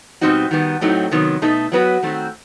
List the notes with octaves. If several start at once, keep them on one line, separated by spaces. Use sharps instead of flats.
B2 G3 C4 D#4 F#4
D#3 G3 B3
A2 F#3 A3 C4 D#4
C3 D#3 F#3 B3
B2 A3 D#4 A4
F#3 B3 F#4 B4
D#3 A3 C4 F#4